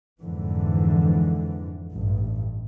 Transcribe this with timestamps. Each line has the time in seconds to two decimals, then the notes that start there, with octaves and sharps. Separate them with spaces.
0.21 F2 G#2 D3 E3
1.91 A1 G2